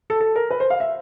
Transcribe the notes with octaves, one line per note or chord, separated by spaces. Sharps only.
A4
A4
A#4
B4
C5
F5
E5